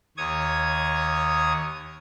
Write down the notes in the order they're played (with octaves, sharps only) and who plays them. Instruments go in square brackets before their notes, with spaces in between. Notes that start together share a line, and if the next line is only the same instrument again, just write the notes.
[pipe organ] D#2 C#5 D#6 G#6